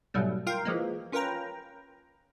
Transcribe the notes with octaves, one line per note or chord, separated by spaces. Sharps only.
G#2 B2 F#3 G3 A3
F4 A#4 F5 G5
E3 F3 G#3 A#3
C#4 F4 A#4 B4 G5 A#5